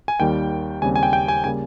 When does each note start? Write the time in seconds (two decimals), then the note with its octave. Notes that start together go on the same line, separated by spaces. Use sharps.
0.08 G#5
0.20 D#2 D#3 G3 G5
0.82 D#2 C#3 G3 C4 G#5
0.96 G#5
1.03 G5
1.13 G5
1.28 G#5
1.44 C#3 G3 A#3 G#5